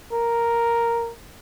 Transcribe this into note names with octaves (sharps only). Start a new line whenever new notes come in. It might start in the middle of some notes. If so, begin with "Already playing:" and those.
A#4